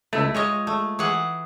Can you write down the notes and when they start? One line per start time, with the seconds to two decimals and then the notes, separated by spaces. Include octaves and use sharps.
0.13 C#2 A3 E4
0.34 G#3 F4 C#5 D#5
0.67 A3
0.99 E3 G#4 F#5